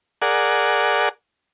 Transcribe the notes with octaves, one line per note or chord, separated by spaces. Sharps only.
G#4 A#4 D5 F#5